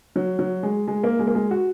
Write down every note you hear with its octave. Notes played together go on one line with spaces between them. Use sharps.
F#3
F#3
G#3
G#3
A#3
G#3
A#3
G#3
F#4